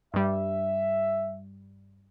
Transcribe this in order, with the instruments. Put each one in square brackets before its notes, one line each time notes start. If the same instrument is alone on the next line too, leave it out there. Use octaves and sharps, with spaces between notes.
[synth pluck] G2 G3 [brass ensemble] E5